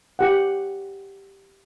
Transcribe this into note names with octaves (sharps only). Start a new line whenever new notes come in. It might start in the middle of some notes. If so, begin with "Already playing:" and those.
G4 F#5